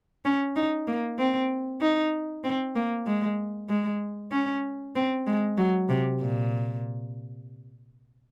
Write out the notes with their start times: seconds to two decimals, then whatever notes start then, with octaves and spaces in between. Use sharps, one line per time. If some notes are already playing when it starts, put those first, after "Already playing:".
0.25 C#4
0.56 D#4
0.87 A#3
1.19 C4
1.81 D#4
2.44 C4
2.76 A#3
3.07 G#3
3.69 G#3
4.32 C#4
4.96 C4
5.27 G#3
5.58 F#3
5.89 C3
6.21 A#2